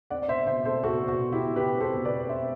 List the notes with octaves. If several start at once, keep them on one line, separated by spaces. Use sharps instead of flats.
C4 D5 F#5
D5
B2 C5 E5
B2 C5 E5
C4 A4 C5
B2 F#4 A4
B2
F#4
B2
E4 G4
B2
B2 G4 B4
C4
A4 C5
B2
B4 D5
C4
C4 C5 E5